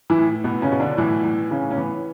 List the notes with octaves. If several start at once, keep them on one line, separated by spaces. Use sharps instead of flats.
E3 E4
A2
B2 B3
C#3 C#4
B2
D3 D4
A2 E3 E4
E3
A2 C#3 C#4
C#4
E3 B3